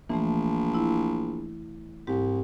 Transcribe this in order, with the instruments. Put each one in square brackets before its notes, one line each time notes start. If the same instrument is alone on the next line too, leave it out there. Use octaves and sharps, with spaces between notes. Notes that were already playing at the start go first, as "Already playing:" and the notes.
[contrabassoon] A#1 [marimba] E3 A3
[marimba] E4
[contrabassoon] C2 [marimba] G#2 G4